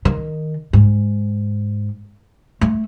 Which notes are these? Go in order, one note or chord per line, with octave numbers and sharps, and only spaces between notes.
D#3
G#2
A3